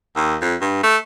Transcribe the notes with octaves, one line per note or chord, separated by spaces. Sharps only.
D#2
F2
G2
A3